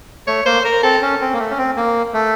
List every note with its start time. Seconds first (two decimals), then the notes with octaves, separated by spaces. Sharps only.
0.27 A3 C#5
0.46 A#3 C5
0.65 A#4
0.83 C4 A4
1.02 C#4
1.21 C4
1.33 A#3
1.39 A3
1.51 C#4
1.58 C4
1.76 A#3
2.14 A3